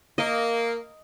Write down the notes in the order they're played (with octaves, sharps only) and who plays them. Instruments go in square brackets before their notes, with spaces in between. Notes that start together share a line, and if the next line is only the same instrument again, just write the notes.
[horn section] A#3 [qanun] D#5